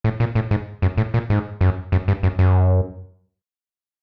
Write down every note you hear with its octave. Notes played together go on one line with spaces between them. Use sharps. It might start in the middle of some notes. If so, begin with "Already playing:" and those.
A2
A#2
A2
G#2
F#2
A2
A#2
G#2
F#2
F#2
G2
F#2
F#2